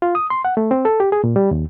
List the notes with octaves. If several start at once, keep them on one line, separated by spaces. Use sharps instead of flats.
F4
D#6
C6
F#5
A3
C4
A4
G4
G#4
A#2
G3
D#2